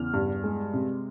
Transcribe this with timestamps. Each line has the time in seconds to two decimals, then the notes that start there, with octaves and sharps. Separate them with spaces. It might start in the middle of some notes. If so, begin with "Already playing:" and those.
Already playing: E2 C#3 F6
0.14 G2
0.44 G#3
0.73 C3